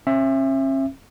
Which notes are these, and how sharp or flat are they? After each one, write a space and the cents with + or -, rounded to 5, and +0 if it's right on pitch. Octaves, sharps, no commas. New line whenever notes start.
C#4 -45 E5 +15